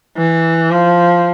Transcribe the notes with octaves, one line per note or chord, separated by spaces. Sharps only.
E3
F3